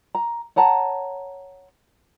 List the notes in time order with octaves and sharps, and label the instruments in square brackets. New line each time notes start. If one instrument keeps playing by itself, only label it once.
[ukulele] A#5
C#5 F#5 A5 A#5